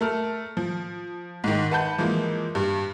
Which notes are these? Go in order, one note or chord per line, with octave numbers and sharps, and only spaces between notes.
A3 A4 A#4 F6
F3
G#2 D#3
B4 F#5 A5 B5 G6
E3 F3 G#3 A#3
G2